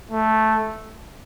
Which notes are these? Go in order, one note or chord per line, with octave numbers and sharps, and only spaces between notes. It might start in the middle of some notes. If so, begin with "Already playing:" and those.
A3